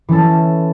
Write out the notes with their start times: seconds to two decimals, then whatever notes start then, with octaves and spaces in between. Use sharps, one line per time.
0.09 E3 C#4 A4